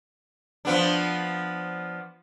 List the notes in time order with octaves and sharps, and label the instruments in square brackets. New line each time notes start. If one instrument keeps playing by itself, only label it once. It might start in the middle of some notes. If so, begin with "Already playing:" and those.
[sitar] F3 B3 D4